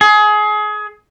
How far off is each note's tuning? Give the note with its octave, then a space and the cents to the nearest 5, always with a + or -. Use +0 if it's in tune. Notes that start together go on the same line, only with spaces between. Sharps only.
G#4 +25